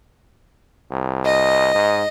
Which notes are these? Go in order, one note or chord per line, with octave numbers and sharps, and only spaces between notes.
C2
D#5
G#2